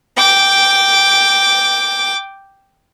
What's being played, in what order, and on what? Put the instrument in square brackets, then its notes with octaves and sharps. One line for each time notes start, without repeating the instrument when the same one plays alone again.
[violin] G5 D6